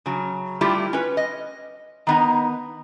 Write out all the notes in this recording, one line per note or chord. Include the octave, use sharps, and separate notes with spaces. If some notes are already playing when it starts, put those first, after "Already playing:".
C#3 F#3
G3 A3 E4 F4 G4
C#4 B4
D#5
D#3 B3 D#4